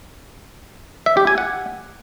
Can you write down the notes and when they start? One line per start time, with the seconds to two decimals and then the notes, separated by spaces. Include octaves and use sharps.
1.06 E5
1.17 G4
1.27 G#5
1.38 F#5